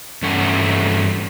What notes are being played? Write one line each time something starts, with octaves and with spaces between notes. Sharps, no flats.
G2 E3 A3 C#4 F#5